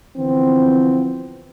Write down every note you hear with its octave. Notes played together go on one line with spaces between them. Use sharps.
D3 E3 F3 B3 C4